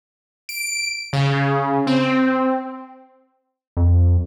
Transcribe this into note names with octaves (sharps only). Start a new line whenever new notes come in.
D7
C#3
C4
F2